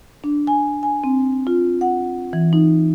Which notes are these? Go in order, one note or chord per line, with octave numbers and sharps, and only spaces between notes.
D4
G#5
G#5
C4
F4
F#5
E3
D#4